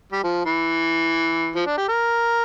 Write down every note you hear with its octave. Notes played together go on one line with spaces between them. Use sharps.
G3
F3
E3
F3
D4
G4
A#4